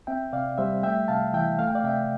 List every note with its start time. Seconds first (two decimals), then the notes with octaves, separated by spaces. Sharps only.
0.07 C4 E5 G5
0.33 C3 D5 F5
0.58 G3 C5 E5
0.83 A3 E5 G5
1.08 C3 F5 A5
1.34 E3 E5 G5
1.59 A3 F5
1.67 G5
1.75 D5 F5
1.84 C3 E5 G5